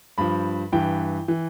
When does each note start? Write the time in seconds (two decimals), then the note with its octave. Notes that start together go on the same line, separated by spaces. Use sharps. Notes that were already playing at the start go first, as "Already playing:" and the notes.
0.18 G2 F3 B5
0.72 G2 E3 G5
1.28 E3